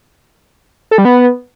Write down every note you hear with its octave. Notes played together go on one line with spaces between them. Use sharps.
A4
G3
B3